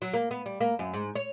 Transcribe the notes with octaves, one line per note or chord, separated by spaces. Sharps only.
F#3
A#3
B3
G3
A#3
F#2
G#2
C#5